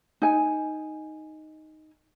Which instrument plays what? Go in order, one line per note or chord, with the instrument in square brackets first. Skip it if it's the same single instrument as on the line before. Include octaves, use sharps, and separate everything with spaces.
[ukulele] D#4 G#5